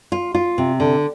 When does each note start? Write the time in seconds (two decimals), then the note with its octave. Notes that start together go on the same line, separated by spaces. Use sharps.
0.12 F4
0.35 F4
0.58 C3
0.80 D3